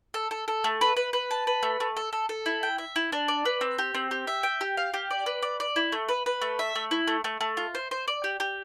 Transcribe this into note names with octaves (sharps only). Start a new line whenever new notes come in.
A4
A4
A4
A3
B4
B4
B4
A5
B4
A3
A3
A4
A4
A4
E4
G5
E5
E4
D4
D5
B4
C4
G4
C4
G4
E5
G5
G4
F5
G4
D5
B4
D5
D5
E4
A3
B4
B4
A3
E5
A3
E4
A3
A3
A3
F4
C5
C5
D5
G4
G4